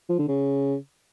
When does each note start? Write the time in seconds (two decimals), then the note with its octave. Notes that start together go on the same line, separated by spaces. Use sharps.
0.09 F3
0.18 D3
0.28 C#3